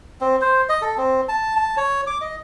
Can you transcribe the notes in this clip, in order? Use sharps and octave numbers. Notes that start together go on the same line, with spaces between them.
C4
C5
D#5
A4
C4
A5
A5
C#5
D6
D#5